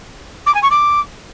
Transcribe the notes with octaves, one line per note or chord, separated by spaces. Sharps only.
D6
G#5
C#6
D6